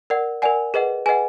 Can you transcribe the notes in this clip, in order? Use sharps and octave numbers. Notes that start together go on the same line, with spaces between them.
A#4 D5 F#5
A#4 D5 F#5 G#5
G#4 B4 D#5 F#5
G#4 B4 D#5 F#5 G#5